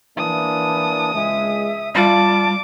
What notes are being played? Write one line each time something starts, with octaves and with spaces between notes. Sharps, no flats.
E3 A#3 D4 D#6
C#2 G#3 E5
G3 F4 A5 D6